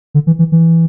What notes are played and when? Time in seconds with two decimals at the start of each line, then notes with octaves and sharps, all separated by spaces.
0.14 D3
0.27 E3
0.39 E3
0.52 E3